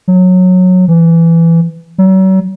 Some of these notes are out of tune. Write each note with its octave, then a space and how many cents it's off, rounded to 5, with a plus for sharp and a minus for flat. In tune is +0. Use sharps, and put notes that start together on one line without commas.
F#3 -15
E3 +15
F#3 +40